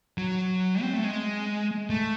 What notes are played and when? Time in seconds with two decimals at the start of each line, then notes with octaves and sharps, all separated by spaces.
0.18 F#3
0.82 C4
0.93 A3
1.04 G#3
1.90 A3